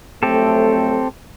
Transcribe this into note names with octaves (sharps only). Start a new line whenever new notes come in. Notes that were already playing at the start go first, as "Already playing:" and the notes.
F2 F#3 A3 C4 G4 A4